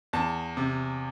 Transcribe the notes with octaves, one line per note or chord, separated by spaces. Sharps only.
E2 A5
C3